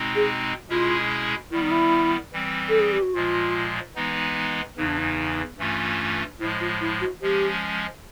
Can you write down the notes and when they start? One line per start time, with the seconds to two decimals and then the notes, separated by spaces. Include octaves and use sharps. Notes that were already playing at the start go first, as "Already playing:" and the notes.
Already playing: B2 G#3 C4 D#4
0.15 G#4
0.69 B2 G#3 C#4 E4 F4 G#4
1.51 D#3 G3 B3 E4
1.62 D#4
1.71 E4
2.32 E3 G3 C4
2.69 A4
2.80 G#4
2.92 G4
3.02 F#4
3.14 A#2 F3 G#3 F4
3.96 E3 G#3 B3 D#4
4.77 E2 C#3 E3 D#4
4.87 D4
4.98 D#4
5.58 G2 E3 A3 C#4 F4
6.39 A2 F3 G#3 E4
6.60 F4
6.80 E4
7.01 F#4
7.21 F3 G#3 C#4 G4